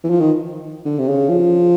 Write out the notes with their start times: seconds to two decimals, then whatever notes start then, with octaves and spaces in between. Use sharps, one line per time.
0.04 E3
0.10 F3
0.20 D#3
0.85 D3
0.99 C3
1.08 C#3
1.29 F3